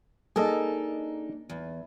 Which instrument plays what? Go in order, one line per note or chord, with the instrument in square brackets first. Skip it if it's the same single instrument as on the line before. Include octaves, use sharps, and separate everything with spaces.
[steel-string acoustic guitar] A#3 D4 D#4 [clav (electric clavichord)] G#4 A4 D#5
[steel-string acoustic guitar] E2